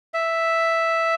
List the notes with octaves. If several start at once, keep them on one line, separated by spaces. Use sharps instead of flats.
E5